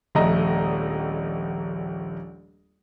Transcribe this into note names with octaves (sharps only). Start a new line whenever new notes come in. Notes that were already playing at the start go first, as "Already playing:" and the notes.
D#1 A#1 A3 D#5 A#5